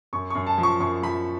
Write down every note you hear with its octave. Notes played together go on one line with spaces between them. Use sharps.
F#2 C#6
F#2 C#6
A5
F3
C#6
F#2 C#6
F3 B5